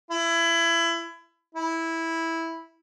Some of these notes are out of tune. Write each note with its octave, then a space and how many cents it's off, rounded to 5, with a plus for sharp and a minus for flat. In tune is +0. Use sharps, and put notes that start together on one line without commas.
E4 +25
E4 -10